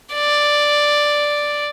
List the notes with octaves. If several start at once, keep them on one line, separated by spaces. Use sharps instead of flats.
D5